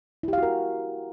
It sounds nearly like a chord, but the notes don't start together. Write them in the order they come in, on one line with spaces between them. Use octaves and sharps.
E4 G4 F5 F#4 A#4